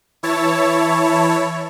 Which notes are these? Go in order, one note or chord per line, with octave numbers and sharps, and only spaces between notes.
E3 E4 C#5 A5